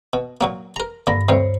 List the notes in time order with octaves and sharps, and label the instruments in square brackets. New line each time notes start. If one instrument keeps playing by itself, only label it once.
[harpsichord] B2
A#2 F#3 A#3
A#4 A#5
[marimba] G2 A#6 [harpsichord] D3 A#3
[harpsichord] D2 G2 C3 [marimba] C5 C#5